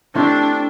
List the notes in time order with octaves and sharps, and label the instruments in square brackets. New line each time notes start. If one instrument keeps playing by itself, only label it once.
[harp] A3 C4 E4 G4 C5 [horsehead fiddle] D4